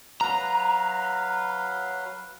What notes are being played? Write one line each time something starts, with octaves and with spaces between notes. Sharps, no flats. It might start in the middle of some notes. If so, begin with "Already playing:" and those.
F#3 B4 F5 A#5